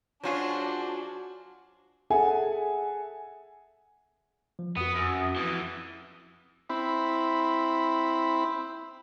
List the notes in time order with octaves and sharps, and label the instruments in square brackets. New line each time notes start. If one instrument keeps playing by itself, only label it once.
[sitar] F#3 F4 [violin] D4 [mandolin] F#4 G#4 C5
[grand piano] G#4 A4 E5 F#5 G#5
[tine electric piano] F3
[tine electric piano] F2 F#4 [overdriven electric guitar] B3 [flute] D#6
[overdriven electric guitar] F#2
F2 E3
[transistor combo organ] C4 E4 B5